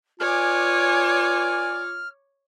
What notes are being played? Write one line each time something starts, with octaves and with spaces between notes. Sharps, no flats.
F4 B4 C#5 D5 G#5 D6 F6